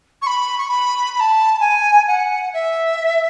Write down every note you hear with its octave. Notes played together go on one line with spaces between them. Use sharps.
C#6
B5
C#6
B5
B5
A5
G#5
F#5
E5